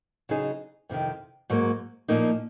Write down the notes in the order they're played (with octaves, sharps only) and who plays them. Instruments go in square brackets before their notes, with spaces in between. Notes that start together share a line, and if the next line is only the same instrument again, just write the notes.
[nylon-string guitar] C#3 F#3 C4 D#4 G#4
F2 C3 D#3
G#2 F#3 A#3
A#2 F3 A#3 D#4